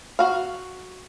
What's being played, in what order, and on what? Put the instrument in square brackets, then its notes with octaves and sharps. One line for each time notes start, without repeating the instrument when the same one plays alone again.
[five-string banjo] F#4 F5